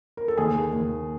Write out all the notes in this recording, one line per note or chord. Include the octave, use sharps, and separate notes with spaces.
A#4
A4
D#2 G#4
D#2